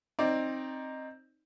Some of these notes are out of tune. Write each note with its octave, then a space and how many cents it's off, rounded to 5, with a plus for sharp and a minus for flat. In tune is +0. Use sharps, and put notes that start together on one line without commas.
C4 +15 D#4 +0 D5 +0